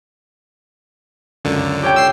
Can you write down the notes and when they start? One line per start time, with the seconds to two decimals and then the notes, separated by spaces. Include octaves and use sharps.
1.45 C#2 F#2 D3
1.83 G4 C#5 G5
1.96 E6 C7